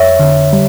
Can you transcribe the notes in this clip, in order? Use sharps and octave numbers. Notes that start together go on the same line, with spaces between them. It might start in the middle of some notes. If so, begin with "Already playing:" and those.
Already playing: F2 C#5 E5
D3
G3